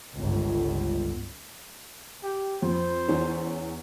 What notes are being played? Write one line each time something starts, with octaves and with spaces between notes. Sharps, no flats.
G1 C#2
G4
F2 C5
E2 C#4